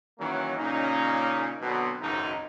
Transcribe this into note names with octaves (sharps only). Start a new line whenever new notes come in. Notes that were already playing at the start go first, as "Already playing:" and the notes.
D#3 E3 F#3 A#3 C#4
A#2 C#3 C#4 D#4
B2 D3 F#3 B3 C4
G#1 C#2 F#2 D#4